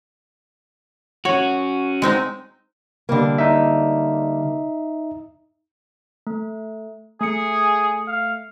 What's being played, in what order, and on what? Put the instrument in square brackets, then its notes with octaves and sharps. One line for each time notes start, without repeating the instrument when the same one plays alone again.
[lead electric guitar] C#4 F#4 [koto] C#5
[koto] G#3 C4 D#4
[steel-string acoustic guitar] D3 G3 A#3
[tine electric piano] D#4 E5
[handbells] A3
[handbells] A3 C#7 [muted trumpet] G#4
[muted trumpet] F5